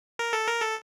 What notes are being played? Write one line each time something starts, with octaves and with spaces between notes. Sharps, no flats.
A#4
A4
A#4
A4